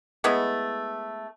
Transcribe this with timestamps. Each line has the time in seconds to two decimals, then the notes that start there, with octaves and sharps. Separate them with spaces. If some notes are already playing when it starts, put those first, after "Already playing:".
0.24 G#3 A3 B3 E4